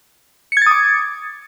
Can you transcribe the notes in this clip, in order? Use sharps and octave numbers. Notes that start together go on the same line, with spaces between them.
D6 D#6 G#6 A6 C#7